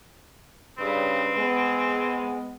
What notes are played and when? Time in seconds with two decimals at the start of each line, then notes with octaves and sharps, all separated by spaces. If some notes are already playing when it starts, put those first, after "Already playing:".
0.78 G2 C#3 C4 B4
1.36 G#3 B3